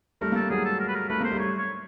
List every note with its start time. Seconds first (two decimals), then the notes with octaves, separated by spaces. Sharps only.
0.21 G3 A3 A#4
0.32 A#3 A4
0.41 A3
0.50 F#3 G#3 G#4
0.65 A4
0.80 A#4
0.88 B4
0.95 A#4
1.09 A3 B4
1.21 A#3 C5
1.32 G3 A3
1.39 C#5
1.58 C#5